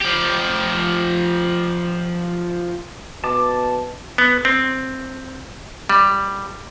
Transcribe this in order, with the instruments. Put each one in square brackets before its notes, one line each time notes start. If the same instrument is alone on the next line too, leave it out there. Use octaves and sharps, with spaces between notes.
[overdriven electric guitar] F3 G4
[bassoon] B2 [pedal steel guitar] A5 D6
[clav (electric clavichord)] B3
C4
G3